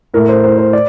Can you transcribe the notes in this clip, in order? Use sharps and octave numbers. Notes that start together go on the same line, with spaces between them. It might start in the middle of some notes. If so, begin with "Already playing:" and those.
A2 A3 A#4
C5
A2 A3 C5
C5
D5